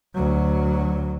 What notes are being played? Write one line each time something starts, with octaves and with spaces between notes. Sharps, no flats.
D2 F#3